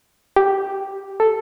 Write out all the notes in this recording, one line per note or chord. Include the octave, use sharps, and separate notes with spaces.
G4
A4